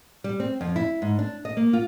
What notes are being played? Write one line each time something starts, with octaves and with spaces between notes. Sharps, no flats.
G3
C4
F2
E4
G#2
D4
D#5
A#3
F4